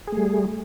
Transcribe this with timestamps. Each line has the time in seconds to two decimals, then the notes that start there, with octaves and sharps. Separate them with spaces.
0.07 G#4
0.12 A3
0.17 G3